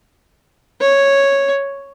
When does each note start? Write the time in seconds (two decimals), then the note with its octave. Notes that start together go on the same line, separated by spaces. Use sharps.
0.81 C#5